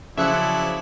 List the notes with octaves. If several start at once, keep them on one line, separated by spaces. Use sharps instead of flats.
C#3 F3 F#3 E4 D5 E5 F#6 C#7